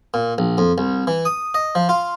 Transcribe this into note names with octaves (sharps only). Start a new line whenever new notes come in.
A#2
A#1
F2
C2
E3
D#6
D#5
F3
F4